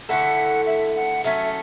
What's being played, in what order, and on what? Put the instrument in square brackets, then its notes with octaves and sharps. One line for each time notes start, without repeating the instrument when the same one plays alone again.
[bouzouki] D3 A3 E4 A4 [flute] F#5
[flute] E5
F#5
[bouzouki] F#3 A3 C#4 [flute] E5